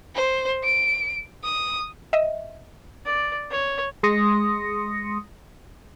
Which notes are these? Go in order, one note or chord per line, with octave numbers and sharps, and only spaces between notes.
C5
D7
D#6
D#5 E5
D5
C#5
G#3 C6 D#6 A#6 C#7